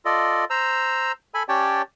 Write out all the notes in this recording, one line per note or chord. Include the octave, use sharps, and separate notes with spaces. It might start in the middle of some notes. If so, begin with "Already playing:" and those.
F4 A4 D5 D#5
C5 A#5 E6
A4 G#5 B5
C#4 G4 C#5 D5 G5 A5